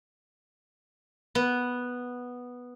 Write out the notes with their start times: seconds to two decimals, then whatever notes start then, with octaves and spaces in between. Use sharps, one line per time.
1.35 B3